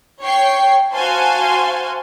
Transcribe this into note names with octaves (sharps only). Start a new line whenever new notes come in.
C#5 G5 C#6 C7
F#4 C5 F5 G#5 A5 C6